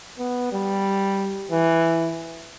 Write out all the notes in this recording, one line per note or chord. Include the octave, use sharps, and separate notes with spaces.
B3
G3
E3